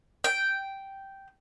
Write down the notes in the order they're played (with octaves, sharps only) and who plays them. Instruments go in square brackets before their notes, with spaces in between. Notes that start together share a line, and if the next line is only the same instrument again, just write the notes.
[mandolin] G5